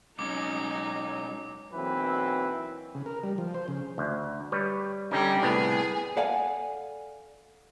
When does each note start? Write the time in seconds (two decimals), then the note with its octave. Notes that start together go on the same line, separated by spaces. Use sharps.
0.19 B2 F#3 G#3 C#4 D#4 D6
1.73 B1 E3 F#3 A#3 C4 B4
2.95 C#3
3.06 A#4
3.23 G3
3.38 F3
3.54 C5
3.68 C#3
3.98 D2
4.52 G3 B4 C#5
5.11 D3 G3 C#4 D#4
5.42 C2 A2 B3 G#4
6.17 A4 D5 F5 F#5 G#5